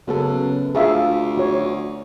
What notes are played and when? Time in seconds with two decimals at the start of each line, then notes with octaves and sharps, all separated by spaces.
0.07 F#2 C#3 B3 A4
0.75 D2 F4 G#4 E5 F5
1.37 F#4 C#5